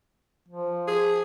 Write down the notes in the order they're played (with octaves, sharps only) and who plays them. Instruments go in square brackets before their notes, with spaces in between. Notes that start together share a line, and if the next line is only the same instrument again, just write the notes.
[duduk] F3
[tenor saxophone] G#4